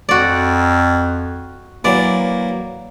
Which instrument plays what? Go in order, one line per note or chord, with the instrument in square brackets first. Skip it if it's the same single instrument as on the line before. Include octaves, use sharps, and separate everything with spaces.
[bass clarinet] F2 [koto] F#4 D5
[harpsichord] E3 F#3 [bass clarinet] A#3 [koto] D5